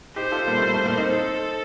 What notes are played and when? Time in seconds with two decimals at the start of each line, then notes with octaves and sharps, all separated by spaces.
0.16 D#4 G4 C5
0.32 F4 A4
0.47 G3 A#3
0.58 A3
0.62 G3
0.74 A3
0.86 G3 A#3
0.97 C4 D#4
1.09 A4